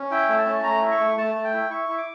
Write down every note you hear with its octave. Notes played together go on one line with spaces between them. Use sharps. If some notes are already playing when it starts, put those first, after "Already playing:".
Already playing: C#4
E4 G5
A3
A5
C#4
A3 A#5
E4
C#6
A3
A3 A5
A3
G5
E4
E4 C#6
E4
D6